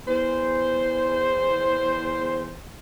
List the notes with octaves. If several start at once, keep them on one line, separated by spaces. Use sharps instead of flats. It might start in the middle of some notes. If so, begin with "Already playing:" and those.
E2 C5